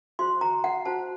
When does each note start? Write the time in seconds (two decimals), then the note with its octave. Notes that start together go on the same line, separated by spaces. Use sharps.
0.19 F#4 C5 C6
0.41 A#5
0.64 F#5
0.86 F#4 C5 A5